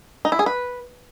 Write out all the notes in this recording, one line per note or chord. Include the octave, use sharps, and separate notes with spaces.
D#4
E4
G#4
B4